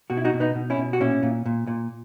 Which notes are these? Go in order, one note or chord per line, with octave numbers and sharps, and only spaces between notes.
B2 F#4
E4
D#4 F#4
B2
B3 D#4
B2
C#4 E4
B2
F#4
A#2 C#4 E4
A#2
A#2
A#2